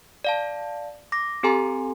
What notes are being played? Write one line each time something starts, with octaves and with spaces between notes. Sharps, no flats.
D5 F5 A5
D6 A#6
C4 G4 A4 G#5 A#5 C6